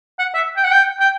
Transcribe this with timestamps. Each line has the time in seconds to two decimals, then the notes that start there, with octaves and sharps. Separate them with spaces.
0.19 F#5
0.34 E5
0.57 G5
0.64 F#5
0.71 G5
1.00 G5